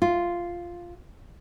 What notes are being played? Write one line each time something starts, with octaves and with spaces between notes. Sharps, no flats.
F4